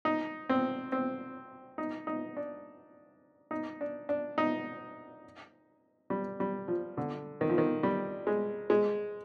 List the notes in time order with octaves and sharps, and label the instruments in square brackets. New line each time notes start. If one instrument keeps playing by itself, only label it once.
[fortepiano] D#4
C4
C4
D#4
D#4
D4
D#4
D4
D4
D#4
G3
G3
F3
D3
D#3
F3
D#3
G3
G#3
G#3